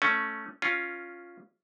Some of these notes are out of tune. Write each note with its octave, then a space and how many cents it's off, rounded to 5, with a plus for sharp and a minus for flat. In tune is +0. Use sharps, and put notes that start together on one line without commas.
A3 +0 C#4 +0
C#4 +0 F4 +0